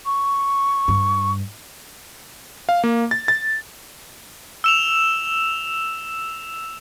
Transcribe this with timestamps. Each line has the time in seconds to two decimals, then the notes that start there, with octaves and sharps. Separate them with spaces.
0.06 C#6
0.88 G2
2.69 F5
2.84 A#3
3.11 A6
3.28 A6
4.64 E6 E7 F7